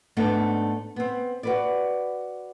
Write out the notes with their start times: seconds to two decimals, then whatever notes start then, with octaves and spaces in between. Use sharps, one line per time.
0.17 G#2 A3 B3 D4
0.96 B3 C4
1.43 F#4 B4 D5